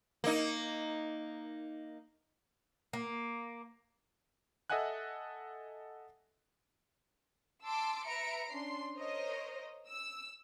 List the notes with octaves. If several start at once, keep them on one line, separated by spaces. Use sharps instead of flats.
A#3 D#4
A#3
A4 D#5 E5 F#5 G#5 F#6
A5 C6 D6 E6
B4 E5 A#5 B5 C#7 D7
C#4 D4 C6 C7
A#4 C5 C#5 D#5
E6